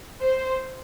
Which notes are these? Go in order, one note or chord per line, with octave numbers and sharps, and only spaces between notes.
C5